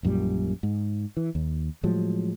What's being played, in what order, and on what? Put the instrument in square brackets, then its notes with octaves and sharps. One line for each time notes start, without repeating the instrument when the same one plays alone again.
[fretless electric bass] A#1 F#2 A#2 G3
G#2
E3
D#2
A2 F3 F#3 G#3